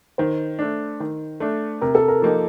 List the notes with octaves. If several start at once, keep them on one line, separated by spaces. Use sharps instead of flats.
D#3 C5
A3 D4
D#3
A3 D4
C3 A#4
A4
A#4
F3 A#3 D#4 G4